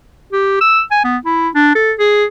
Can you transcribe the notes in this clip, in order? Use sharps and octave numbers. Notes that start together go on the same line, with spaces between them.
G4
E6
G#5
B3
E4
D4
A4
G#4